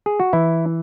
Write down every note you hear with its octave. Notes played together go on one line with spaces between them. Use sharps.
G#4
F#4
E3 E4